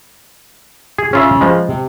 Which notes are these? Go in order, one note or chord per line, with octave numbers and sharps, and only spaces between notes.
G#4
C#3 C#4 F4 E5
F3 G#3
C3